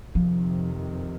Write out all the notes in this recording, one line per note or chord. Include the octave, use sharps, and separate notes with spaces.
F2 C3 D#3 F3